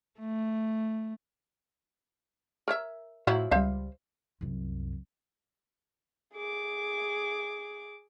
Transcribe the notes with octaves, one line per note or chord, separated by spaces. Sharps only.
A3
A#4 C#5 E5
A2 F3 F#3 E4
C#2 G3 C5 E5 F5
C2 F#2
G#4 D6